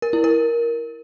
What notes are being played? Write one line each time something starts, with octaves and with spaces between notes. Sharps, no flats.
A#4
E4
A#4